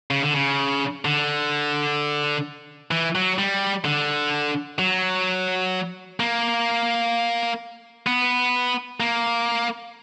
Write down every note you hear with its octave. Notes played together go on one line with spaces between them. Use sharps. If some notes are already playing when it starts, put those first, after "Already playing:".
C#3
D3
C#3
D3
E3
F#3
G3
D3
F#3
A#3
B3
A#3